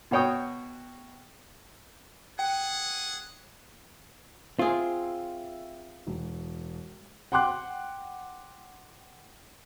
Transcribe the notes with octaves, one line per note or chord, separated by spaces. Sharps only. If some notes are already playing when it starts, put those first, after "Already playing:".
B2 F#4 C#5 G5 D#6
G#4 F#5 G5
C4 F4 G#4 E5
E1
F#5 G5 C6 D6 F#6